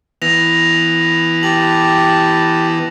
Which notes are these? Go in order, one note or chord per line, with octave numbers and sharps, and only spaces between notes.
E3 B3 A#6 F7
G4 A5 F#7